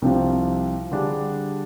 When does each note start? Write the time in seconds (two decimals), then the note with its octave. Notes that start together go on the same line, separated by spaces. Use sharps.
0.02 C2 C3 F3
0.91 D3 G3 D4 G#4